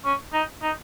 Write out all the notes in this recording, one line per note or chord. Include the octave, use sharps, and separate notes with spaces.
C#4
D#4
D#4